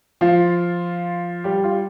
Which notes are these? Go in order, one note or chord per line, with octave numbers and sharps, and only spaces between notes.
F3 F4
G3 G4
F4